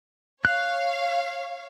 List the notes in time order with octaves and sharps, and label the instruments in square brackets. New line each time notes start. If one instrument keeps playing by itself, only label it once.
[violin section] C#5 F5 [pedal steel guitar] F#6